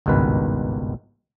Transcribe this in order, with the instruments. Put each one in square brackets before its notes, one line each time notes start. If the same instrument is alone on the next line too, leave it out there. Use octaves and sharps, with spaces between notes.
[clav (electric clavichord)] G#1 C#2 G2 B2 D#3 B4